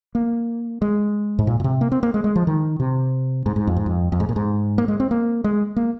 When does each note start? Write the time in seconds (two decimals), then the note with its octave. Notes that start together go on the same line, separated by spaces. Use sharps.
0.15 A#3
0.82 G#3
1.39 G#2
1.47 A#2
1.60 A#2
1.64 C3
1.81 A#3
1.92 C4
2.03 A#3
2.14 G#3
2.24 G#3
2.36 F3
2.47 D#3
2.80 C3
3.46 G#2
3.56 G#2
3.67 F2
3.77 G#2
3.86 F2
4.12 F2
4.20 G#2
4.29 A#2
4.36 G#2
4.78 A#3
4.88 G#3
5.00 C4
5.11 A#3
5.44 G#3
5.76 A#3